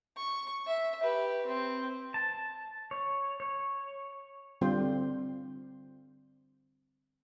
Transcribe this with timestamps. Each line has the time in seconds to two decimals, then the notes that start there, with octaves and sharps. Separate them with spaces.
0.17 C#6
0.67 E5
1.02 G4 B4
1.47 C4
2.14 A5
2.91 C#5
3.40 C#5
4.61 D3 G3 C4 F4 C5